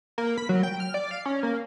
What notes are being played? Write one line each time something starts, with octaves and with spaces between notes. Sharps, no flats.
A#3
B5
F#3
G5
F6
D5
F5
C#4
A#3